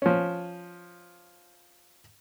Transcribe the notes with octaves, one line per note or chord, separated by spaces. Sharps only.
F3 C#4